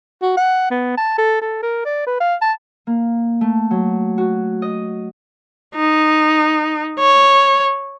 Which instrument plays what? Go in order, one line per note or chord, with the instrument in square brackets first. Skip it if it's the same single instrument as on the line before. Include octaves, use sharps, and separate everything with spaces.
[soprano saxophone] F#4
F#5
B3
A5
A4
A4
A#4
D5
B4
F5
A5
[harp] A#3
A3
F#3
F#4
D#5
[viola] D#4
C#5